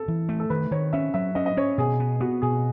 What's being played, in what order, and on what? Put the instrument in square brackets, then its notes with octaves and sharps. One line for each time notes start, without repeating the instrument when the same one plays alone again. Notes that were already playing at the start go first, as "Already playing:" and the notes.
Already playing: [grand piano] A4
[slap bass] E3
A3
[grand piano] A4
[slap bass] D#3 [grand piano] B4
[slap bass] D#3 [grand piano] C#5
[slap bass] C#4 [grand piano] E5
[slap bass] F#3 [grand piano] E5
[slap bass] C#4 [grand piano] D#5
[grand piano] D#5
[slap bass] C#4 [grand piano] C#5
[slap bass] B2 [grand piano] G#4
[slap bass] B3
[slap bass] B3 [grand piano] F#4
[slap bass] B2 [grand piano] G#4